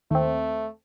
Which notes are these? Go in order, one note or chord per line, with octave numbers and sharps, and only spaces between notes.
D#2 A3 C4